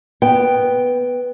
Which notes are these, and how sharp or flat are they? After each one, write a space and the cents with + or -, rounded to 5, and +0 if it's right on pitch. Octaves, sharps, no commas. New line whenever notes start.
B3 +0 G5 +0